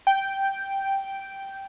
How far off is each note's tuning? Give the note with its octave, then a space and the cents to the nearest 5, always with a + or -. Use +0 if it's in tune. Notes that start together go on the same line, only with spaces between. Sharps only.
G5 -5